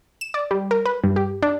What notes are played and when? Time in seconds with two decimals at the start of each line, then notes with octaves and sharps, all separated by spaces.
0.21 E7
0.34 D5
0.51 G3
0.71 A#4
0.86 B4
1.04 G2
1.16 G4
1.43 D4